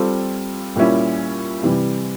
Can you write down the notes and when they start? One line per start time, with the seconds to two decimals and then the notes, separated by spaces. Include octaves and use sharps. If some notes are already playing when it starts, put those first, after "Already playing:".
Already playing: G3 C4 F4 A4
0.76 A#2 G3 A#3 C#4 E4
1.63 C3 E3 G3